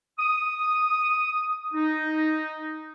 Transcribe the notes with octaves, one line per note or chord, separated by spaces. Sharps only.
D#6
D#4